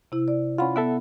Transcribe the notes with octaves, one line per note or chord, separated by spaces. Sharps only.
C3 E4
D5
C#4 F4 F#5 B5
B3 A4 E5 F#5